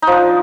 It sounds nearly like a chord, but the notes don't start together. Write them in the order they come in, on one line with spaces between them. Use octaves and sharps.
D#4 F3 D4